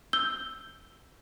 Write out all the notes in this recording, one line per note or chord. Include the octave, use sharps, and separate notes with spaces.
E6 G6 G7